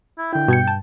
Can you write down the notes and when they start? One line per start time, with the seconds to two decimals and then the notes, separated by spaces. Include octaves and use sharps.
0.18 E4
0.33 D3 E4 G5
0.48 G2 B2 G#6 C#7
0.67 A5